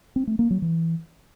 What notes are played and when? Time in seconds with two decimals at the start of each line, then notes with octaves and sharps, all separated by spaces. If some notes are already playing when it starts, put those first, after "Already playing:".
0.16 C4
0.27 A3
0.39 A#3
0.50 F#3
0.62 E3